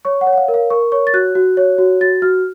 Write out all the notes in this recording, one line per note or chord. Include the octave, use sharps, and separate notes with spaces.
C#5 C#6
F#5
C#5
F#5
F5
A#4
F5
A#4 C#6
C#5 C#6
A6
F#4 F#6
F#4
C#5
F#4
F#4 A6
F#4 F6